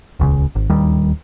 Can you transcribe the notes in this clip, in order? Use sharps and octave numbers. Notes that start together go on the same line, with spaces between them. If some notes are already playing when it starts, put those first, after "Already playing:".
D#1 C#2 C#3
G#1
D1 D#2 D#3 G3